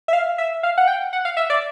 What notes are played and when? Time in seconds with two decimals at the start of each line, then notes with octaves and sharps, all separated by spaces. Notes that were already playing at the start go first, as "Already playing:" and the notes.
0.08 E5
0.13 F5
0.38 E5
0.63 F5
0.78 F#5
0.88 G5
1.13 F#5
1.25 F5
1.37 E5
1.50 D5